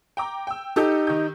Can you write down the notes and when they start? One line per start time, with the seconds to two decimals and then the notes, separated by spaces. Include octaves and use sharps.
0.17 G5 A#5 D6
0.47 G5 E6
0.76 D#4 G4 A4 E6 G6
1.07 D#3 G6